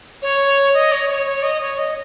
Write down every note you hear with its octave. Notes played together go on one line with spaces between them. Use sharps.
C#5
D#5
C#5
C#5
C#5
D#5
C#5
D#5